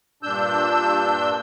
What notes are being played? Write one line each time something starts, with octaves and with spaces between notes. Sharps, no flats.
G2 A#2 D4 E6 G6